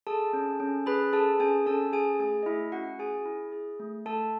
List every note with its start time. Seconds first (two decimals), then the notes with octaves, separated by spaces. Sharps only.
0.07 G#4 A4 A5
0.33 C#4
0.60 C#4
0.86 G#4 B4 B5
1.13 G#4 A4 A5
1.40 C#4 G#4 G#5
1.66 C#4 A4 A5
1.93 G#4 G#5
2.20 A3 G#4 G#5
2.43 D#5
2.46 A3 E4 E5
2.72 C#4 F#4 F#5
2.99 G#4 G#5
3.25 E4
3.52 G#4
3.79 A3
4.05 A3 A4 A5